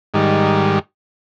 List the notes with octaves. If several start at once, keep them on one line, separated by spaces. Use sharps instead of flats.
G#2 D#3 G3